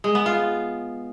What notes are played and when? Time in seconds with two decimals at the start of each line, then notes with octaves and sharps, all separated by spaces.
0.04 G#3
0.15 B3
0.26 F4